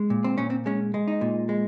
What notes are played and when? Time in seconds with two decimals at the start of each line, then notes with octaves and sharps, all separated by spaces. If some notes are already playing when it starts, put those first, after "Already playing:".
Already playing: G#3
0.10 A#2
0.24 C4
0.38 A#2 C#4
0.50 C4
0.66 G#3 C#4
0.94 G#3
1.08 D#4
1.21 A#2
1.49 G#3